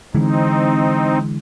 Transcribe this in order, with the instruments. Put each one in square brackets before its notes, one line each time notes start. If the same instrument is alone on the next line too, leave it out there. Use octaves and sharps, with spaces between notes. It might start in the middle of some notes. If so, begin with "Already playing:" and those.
[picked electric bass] D3 E3 G#3 [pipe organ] C4 D#4